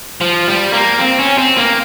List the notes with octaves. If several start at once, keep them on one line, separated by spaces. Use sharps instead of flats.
F3
G3
A#3
C4
C#4
C4
A#3